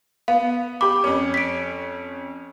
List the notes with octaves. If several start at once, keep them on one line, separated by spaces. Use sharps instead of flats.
B3 F5
G4 B5 D6
F2 C#4
B6 D7